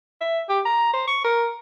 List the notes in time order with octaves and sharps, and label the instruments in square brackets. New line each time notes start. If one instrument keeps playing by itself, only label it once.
[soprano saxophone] E5
G4
A#5
C5
C#6
A#4